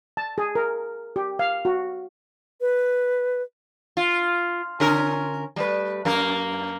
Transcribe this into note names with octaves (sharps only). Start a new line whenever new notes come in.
A5
G#4
A#4
G4
F5
F#4
B4
F4
D3 C#4 A#4
G3 A3 B4
F#2 A#3 A#4